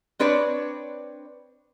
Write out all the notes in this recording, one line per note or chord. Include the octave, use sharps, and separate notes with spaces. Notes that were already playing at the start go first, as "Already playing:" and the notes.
C4 D4 B4 C#5 D5